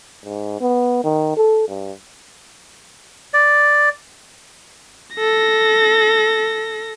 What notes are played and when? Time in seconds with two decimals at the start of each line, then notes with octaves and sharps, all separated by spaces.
0.25 G#2
0.61 B3
1.04 D#3
1.37 A4
1.68 G2
3.34 D5
5.16 A4 A#6